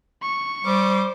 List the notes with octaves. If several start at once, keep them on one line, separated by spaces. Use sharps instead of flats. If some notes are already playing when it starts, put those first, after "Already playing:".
C#6
G3 C5 D6